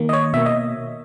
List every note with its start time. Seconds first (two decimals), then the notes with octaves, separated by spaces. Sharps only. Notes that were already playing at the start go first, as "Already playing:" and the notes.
Already playing: D#3 A#3
0.09 D#5
0.13 C#5
0.33 B2 A#3 E5
0.46 D#5